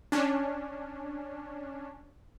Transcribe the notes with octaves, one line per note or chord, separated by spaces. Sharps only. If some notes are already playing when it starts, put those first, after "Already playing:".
C#4 D4